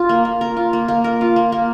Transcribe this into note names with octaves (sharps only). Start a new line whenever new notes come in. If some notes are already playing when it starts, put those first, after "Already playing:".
Already playing: F4
A#3
A#3
A#4
F4
A#3
A#3
A#4
F4
A#3
A#3